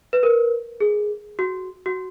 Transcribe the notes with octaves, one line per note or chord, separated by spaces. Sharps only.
B4
A#4
G#4
F#4
F#4